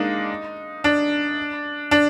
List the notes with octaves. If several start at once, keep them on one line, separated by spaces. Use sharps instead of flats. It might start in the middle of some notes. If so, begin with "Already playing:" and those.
Already playing: G#3 A#3 D4 D#4
D4
D4